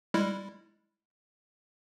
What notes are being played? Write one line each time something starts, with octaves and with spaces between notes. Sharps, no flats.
G3 G#3 E4